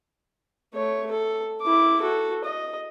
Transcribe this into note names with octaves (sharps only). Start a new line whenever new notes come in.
A3 C#5
A4
E4 D6
F#4 A4
D#5